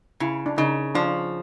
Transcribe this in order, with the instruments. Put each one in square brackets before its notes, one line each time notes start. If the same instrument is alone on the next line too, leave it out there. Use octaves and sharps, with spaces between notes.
[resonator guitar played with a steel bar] C#3 [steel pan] E4
[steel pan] D4
[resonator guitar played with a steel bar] C#3 [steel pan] D#4
[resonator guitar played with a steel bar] F3 [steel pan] D4